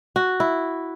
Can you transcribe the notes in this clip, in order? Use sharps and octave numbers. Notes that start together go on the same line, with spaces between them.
F#4
E4